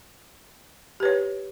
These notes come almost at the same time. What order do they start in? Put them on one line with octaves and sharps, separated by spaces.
G4 B4 C#5